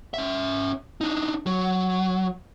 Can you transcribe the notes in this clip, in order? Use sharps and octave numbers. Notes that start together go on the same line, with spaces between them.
C#4 E5
D4 D#4
F#3